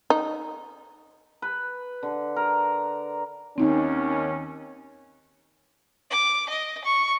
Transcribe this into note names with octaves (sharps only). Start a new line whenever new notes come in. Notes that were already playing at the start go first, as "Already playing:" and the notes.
D#4
B4
D3
A#4
D#2 D#3 C4 C#4 D#4
D6
D#5
C#6